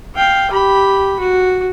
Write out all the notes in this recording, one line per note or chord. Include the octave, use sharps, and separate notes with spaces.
F5 G5
G4 B5
F#4